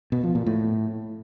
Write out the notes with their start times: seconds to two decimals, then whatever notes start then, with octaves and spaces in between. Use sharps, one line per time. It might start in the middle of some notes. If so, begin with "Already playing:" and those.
0.12 B2
0.24 F3
0.35 A#2
0.46 A2